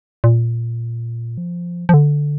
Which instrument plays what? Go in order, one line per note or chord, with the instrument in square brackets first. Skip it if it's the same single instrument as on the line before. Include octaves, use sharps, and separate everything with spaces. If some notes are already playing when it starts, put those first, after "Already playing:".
[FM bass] A#2
F3
F3
D3